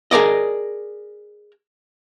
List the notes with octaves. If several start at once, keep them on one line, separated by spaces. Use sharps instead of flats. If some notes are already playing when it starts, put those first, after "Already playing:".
G#4 A#4 D5 D#5